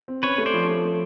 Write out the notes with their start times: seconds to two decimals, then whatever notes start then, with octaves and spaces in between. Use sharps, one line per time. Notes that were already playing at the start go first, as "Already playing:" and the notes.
0.08 C4
0.23 C#4 B4 C#5
0.38 A3
0.46 C5 D5
0.54 F3
0.68 A3
0.84 A3